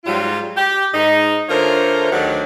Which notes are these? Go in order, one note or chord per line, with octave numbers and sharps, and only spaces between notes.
G#2 F#3 G3 F4
G4
G#2 D#4 D#5
D3 A3 F4 A#4 C5 C#5
D2 D3 D#3 F#3 G4 F#5